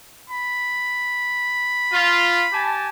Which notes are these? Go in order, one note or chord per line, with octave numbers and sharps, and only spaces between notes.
B5
F4
G4 G#5 A5